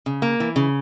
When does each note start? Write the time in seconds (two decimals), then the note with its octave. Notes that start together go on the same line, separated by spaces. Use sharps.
0.06 C#3
0.22 A#3
0.40 E3
0.56 C#3